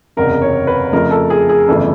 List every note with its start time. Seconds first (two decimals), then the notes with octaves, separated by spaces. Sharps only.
0.17 F#1 E2 C3 A#4
0.42 C#5
0.67 B4
0.92 F2 C#3 F3 A3 A#4
1.11 A4
1.30 G#4
1.49 G#4
1.68 G1 F2 C#3 E3 A3 A4